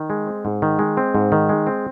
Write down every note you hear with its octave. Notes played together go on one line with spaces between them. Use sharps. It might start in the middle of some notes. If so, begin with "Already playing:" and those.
Already playing: D#3
G#3
C4
G#2
D#3
G#3
C4
G#2
D#3
G#3
C4